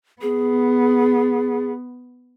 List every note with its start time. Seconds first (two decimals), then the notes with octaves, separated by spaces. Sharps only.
0.22 B3 G#4